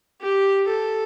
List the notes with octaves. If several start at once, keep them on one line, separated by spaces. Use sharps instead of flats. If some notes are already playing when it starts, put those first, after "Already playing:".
G4
A4